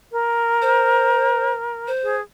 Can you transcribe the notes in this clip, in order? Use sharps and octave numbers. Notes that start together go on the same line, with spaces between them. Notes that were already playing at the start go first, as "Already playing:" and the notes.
A#4
C5
C5
G#4